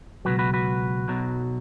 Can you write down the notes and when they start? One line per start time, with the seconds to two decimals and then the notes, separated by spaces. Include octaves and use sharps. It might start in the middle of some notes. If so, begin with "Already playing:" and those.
0.25 C#2 B2 F#3 F#4 B4
0.39 F#4 B4
0.54 F#4 B4
1.08 B1 B2 F#3